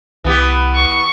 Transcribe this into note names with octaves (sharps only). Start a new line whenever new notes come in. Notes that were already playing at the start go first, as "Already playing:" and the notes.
C2 E3 B3 G4
C#6